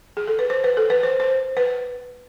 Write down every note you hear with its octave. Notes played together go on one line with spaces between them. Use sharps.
G#4
A4
B4
C5
B4
A4
B4
C5
C5
B4